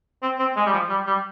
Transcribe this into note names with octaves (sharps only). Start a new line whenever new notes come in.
C4
C4
G#3
G3
F3
G3
G3